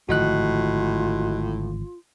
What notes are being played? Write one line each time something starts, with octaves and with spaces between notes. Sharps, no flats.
G#1 A2 D3 F3 F4 F#4 D#5 F#6